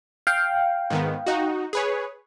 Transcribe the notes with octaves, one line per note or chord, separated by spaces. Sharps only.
F5 G5
G#2 D#3 B3
D#4 F#4
G#4 B4 C#5